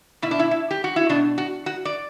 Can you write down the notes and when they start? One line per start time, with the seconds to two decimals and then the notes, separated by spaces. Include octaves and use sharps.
0.22 B2 E4
0.31 D4
0.39 E4
0.51 E4
0.71 G4
0.84 F#4
0.96 E4
1.09 B2 D4
1.38 F#4
1.66 F#4
1.85 D5